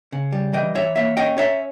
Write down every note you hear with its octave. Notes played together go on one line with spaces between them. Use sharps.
C#3
G3
E3 D#5 G5
E3 C#5 E5
A#3 C#5 E5
C#4 D#5 G5
C#4 C#5 E5